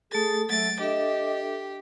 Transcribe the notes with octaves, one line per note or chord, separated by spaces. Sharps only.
A3 G#4 A4 A6
F#3 A3 A6 D7
D4 G4 A4 D#5 E5